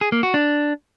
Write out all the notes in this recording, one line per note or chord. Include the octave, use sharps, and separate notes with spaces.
G#4
A#3
F#4
D4